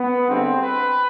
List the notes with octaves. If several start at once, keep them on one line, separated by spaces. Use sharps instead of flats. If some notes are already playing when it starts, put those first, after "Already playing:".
Already playing: B3
G1 G2 D3 G#3 C4
B4